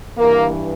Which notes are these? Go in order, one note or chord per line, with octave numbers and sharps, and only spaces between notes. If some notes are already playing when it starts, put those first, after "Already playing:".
G2 E3 A#3